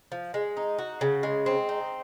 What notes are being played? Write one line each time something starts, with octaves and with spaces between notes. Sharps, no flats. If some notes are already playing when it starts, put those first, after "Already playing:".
F3
G#3
D#4
F#4
C#3
G#3
C4
D#4